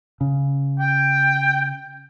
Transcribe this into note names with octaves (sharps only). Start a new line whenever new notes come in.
C#3
G5